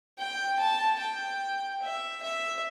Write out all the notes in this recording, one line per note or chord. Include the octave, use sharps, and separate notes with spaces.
G5
A5
G5
E5
E5